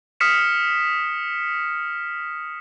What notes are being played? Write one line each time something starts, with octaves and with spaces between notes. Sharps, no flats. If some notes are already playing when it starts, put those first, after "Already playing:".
D#6 F6 B6 C#7 E7